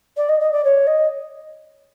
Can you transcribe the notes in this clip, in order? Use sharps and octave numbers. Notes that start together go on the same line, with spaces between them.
D5
D#5
D#5
D5
C#5
D#5